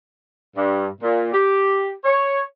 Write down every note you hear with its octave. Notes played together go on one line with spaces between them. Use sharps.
G2
A#2
G4
C#5